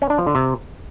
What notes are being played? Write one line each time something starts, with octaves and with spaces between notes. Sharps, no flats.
C#4
D4
F3
D3
C3